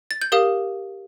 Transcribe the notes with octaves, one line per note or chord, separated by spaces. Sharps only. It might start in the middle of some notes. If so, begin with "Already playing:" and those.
A6
G6
G4 A#4 F5 D#6